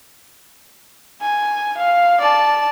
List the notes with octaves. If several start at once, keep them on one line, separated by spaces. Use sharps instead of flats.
G#5
F5
D5 A5